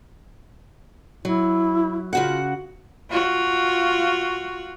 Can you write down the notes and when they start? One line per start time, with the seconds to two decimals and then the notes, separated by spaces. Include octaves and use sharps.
1.25 F#3 E4
2.13 C#3 F4 F#4 F#5
3.10 F4 F#4